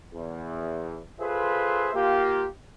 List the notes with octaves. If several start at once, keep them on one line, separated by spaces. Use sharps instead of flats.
E2
F4 G#4 A4 B4 C5 E5
A#3 F4 G4